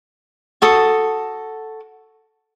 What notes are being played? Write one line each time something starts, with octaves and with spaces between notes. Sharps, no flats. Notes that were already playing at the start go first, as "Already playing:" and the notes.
F#4 A4 D#6